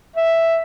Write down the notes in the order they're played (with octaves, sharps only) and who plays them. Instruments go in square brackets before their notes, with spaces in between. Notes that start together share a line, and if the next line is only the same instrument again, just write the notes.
[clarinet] E5